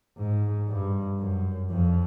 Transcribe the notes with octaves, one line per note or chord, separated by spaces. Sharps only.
G#2
G2
F#2
F2